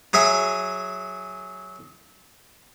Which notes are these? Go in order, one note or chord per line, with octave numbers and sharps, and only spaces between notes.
F#3 G#4 E5 G#5